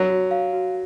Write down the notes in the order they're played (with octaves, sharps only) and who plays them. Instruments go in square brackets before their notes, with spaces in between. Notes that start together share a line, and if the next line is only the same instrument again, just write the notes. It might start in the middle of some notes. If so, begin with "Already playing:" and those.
Already playing: [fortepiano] F#3
[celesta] F#4
F5
F#4